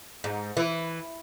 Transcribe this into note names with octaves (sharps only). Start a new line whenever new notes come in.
G#2
E3